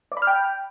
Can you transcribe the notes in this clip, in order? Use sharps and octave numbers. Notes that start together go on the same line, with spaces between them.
D5
B5
F6
G5